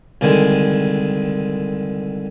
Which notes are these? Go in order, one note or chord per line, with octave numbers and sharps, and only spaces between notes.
C2 D3 D#3 G#3